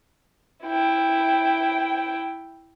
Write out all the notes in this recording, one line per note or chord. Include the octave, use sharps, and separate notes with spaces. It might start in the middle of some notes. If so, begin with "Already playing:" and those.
E4 G5